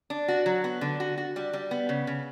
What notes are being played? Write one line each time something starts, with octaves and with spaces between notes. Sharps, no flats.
D4
F#4
F#3
B3
D3
F#4
F#4
G3
G3
B3
C#3
C#3